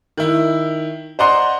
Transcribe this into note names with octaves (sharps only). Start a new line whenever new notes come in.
D#3 E4
C5 D5 D#5 F#5 A#5 C6